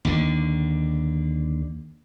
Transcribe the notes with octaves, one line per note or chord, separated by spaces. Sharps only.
D#2 D3